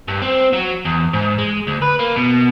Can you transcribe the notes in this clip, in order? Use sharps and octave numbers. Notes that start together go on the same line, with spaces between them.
G2
C4
F#3
E2
G#2
G#3
D2
B4
A#3
B2